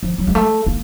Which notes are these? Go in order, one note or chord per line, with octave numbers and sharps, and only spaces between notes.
F3
F#3
G#3
A3
A#3